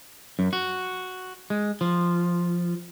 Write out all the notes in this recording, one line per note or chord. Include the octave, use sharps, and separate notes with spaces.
F#2
F#4
G#3
F3